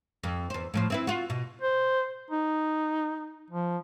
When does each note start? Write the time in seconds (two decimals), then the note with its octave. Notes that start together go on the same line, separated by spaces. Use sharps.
0.23 F2
0.50 E2 C5
0.74 A2 F3 C5
0.90 C4 E4 B4
1.07 F4 F#4
1.30 B2
1.61 C5
2.30 D#4
3.50 F3